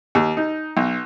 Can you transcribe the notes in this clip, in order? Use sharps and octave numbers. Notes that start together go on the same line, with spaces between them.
D#2
D#4
B1